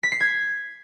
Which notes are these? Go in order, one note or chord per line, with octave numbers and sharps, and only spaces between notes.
B6
C7
G#6